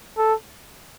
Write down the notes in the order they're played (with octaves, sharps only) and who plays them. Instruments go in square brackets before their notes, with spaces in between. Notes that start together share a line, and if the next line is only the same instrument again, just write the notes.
[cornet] A4